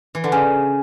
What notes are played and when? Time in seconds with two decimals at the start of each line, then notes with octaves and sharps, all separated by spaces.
0.15 E3
0.24 D3
0.32 C#3 G#5